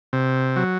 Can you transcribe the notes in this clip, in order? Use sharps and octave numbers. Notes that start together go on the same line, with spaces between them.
C3
F#3